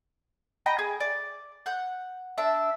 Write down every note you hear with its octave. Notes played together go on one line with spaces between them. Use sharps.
D#5 G5 A#5 B5
G#4
D5
F#5 G6
D4 E5